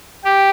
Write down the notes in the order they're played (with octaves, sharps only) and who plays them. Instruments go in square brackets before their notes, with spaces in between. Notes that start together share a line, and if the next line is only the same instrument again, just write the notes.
[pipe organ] G4